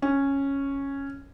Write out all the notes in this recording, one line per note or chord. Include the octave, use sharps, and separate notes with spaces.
C#4